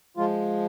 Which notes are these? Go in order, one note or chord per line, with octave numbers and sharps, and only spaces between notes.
F3 G#3 F4